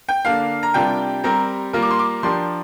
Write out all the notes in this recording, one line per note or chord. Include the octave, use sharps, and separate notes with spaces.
G5
D3 A#3 D4 F5
A#5
C3 G3 D4 F4 A#4 G5
G3 C4 G4 A#4 A#5
G3 A#3 F4 A#4
D6
C6
D6
F3 D4 G4 A#4 C6